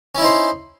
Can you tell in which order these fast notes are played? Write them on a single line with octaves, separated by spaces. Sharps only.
C#4 E4 D#4 C5